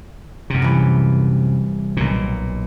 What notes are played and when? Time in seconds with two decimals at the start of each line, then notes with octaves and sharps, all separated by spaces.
0.50 F#2 C3
0.62 C2 E3
1.97 B1 A#2